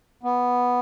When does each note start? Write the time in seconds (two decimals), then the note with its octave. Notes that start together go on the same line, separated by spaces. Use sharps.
0.23 B3